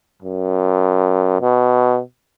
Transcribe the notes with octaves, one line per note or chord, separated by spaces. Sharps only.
F#2
B2